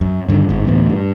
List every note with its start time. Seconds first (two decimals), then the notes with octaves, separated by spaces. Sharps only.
0.01 F#2
0.28 G2 D3 D#3
0.49 G1 G#2
0.67 D2 A2 E3 B3
0.89 G2